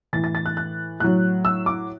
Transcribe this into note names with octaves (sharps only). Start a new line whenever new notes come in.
A2 E3 A6
A6
A6
F#6
F#6
A2 F#3 F#6
E6
D6